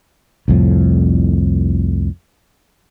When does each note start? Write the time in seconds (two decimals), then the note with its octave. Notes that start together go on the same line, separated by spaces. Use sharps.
0.48 C2 F2 A2